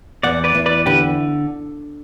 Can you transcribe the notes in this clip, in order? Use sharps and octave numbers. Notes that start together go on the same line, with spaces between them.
E2 D5 F#5
B4 D5
E2
B4 D5
D3 G4 B4